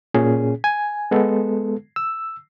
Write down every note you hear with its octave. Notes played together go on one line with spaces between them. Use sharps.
A#2 C#4 G#4
G#5
G#3 B3 A4
E6